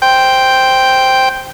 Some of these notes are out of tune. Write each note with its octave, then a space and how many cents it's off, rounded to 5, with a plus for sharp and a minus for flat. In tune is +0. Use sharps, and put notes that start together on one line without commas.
C5 +0 G5 +0